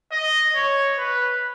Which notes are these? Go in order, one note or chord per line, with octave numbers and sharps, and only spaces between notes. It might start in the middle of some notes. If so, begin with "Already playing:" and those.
D#5
C#5
B4